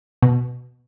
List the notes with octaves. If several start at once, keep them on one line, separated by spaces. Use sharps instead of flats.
B2